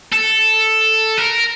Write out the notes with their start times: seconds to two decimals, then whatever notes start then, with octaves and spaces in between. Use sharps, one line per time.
0.12 A4
1.18 A#4